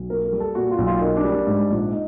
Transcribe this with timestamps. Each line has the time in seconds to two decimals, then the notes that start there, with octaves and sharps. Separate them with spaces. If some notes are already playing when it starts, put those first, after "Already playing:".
Already playing: B1
0.10 A#3 A#4
0.25 A#4
0.32 G3
0.40 A4
0.55 A#2 F#4
0.71 F4
0.78 B1
0.87 F4
1.01 A#3 D#4
1.17 D4
1.24 G3
1.32 D4
1.47 G#2
1.70 A#1
1.93 D#4